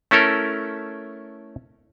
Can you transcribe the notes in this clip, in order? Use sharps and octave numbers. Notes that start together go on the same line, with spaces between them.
A3 C#4 E4 A4 A#4